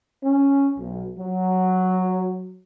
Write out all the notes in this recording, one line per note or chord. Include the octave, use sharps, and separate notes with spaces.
C#4
B1
F#3